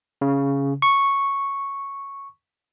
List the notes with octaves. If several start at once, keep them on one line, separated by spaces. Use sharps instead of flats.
C#3
C#6